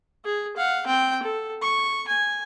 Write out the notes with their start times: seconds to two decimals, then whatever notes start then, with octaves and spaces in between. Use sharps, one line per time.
0.25 G#4
0.57 F5 F#5
0.86 C4 G5
1.23 A4
1.62 C#6
2.08 G#5